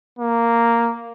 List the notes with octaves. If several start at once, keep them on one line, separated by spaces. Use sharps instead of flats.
A#3